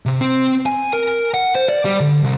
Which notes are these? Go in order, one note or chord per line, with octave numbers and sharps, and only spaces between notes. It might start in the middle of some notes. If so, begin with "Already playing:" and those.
C3
C4
G#5
A#4
F#5
C5
D5
G3
D3
C2